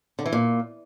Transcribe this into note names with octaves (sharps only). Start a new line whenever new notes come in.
D3
E3
A#2